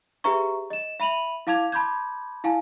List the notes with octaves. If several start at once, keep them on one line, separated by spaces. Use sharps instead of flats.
G4 G#4 B4 E5 A#5 C#6
D#5 E7
E5 B5 D#7 F7 F#7
E4 F5 A5 D6 G#6 F7
A5 B5 C6 D6 G6 G#6
E4 F5 G#5 A5